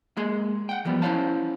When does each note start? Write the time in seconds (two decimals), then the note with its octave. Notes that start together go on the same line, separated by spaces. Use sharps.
0.17 G#3 A#3 G#4 C6
0.69 F#5 G5
0.85 E3 F3 G3 B3
1.02 C#4 E4 C5 C#5 F5 A5